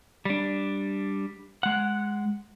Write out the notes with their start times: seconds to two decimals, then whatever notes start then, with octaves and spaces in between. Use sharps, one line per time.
0.25 G3 D4
1.63 G#3 F#5